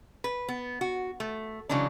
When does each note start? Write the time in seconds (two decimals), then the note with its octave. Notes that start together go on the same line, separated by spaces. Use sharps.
0.24 B4
0.49 B3
0.81 F#4
1.20 A3
1.69 C#3 E3 F#3 G#3 D4